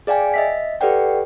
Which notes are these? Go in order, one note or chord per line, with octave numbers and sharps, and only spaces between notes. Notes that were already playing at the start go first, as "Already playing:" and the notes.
G#4 D5 F5 G5 G#5
D#5 E5 B6
G4 A4 B4 D5 F#5 G5